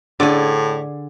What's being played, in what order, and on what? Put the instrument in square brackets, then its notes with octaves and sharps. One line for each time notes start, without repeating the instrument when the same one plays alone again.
[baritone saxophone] A2 [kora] D3 [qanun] G#4 D5